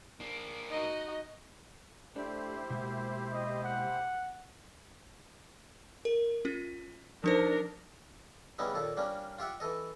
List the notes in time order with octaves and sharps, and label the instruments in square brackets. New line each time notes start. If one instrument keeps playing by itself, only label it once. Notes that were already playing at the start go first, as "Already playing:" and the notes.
[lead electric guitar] A#3 D4
[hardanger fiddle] D#4 F#4 [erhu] D#5
[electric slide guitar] A3 D4 D5 [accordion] E4 G4 C5
[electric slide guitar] B2 G#3 A#3
[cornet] D#5
F#5
[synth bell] A#4
C#4 F4
[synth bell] F3 D#4 C5 [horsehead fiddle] D4 A#4
[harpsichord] C#3 G3 B3 C#4 D#4 E4
D#2 A#2 A4
G3 A#3 C#4 D4
F4 G4 E5 F#5
E3 A4 D#5